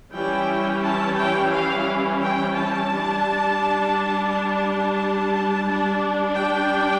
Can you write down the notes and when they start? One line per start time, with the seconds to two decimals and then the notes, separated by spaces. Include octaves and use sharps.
0.13 E3 G3 C#4 E4 G5
0.82 A5
1.17 G5
1.51 F5
2.20 G5
2.55 A5
2.90 G3 D4
4.28 A5
5.66 G3 D4
6.35 G5